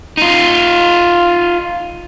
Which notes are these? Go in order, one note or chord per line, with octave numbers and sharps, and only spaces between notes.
D#4 F4